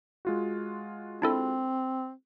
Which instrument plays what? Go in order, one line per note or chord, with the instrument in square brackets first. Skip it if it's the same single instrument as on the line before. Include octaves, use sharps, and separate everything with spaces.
[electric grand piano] G#3 F4 F#4
[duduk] C4 [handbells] D4 E4 A4